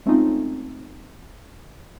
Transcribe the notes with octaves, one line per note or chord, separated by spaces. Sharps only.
G#3 A3 C4 C#4 D#4 F4